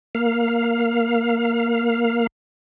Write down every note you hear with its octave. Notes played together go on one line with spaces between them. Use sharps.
A#3 F5